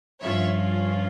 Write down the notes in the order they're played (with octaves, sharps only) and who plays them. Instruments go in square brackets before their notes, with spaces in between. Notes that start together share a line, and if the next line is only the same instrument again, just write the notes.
[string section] G2 F3 C#4 F4 C#5 E5